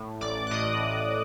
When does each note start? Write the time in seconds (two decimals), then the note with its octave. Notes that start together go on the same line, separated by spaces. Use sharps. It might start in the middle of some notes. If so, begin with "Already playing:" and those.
Already playing: A2
0.21 A1 D5 D6
0.47 F#6
0.51 A2 D#5 D#6
0.82 A1